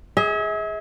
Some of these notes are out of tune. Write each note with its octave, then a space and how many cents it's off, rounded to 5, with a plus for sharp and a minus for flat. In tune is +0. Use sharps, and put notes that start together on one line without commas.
G#4 +0 E5 -45